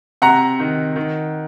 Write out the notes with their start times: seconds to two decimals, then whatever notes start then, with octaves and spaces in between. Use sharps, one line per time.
0.22 C3 F#5 A#5
0.60 D#3
0.96 D#3